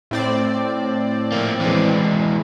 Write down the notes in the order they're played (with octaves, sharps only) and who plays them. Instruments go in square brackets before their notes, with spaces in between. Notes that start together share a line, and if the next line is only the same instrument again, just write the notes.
[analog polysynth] A2 C4 D5
[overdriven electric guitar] F3 A#3
E3 G#3